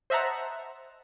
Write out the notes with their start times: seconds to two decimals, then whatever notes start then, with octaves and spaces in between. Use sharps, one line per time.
0.10 C5 D#5 E5 F#5 A5 A#5